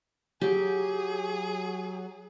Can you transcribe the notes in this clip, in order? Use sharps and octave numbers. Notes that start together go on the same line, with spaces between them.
F#3 G4 G#4